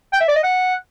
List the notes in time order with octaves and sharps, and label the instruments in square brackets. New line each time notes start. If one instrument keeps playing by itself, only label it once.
[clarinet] G5
E5
D5
D#5
F#5